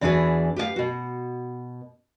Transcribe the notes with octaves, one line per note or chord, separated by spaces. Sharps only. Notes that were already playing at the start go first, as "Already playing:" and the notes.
E2 E3 D4 F#4 G#4 B4
G4 B4 D#5 F5
B2 F#4